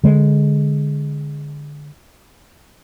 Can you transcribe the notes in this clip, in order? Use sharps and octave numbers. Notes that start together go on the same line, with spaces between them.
D3 G#3